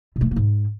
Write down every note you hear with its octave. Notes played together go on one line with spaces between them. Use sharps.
B2
A3
E3
A#3
G#2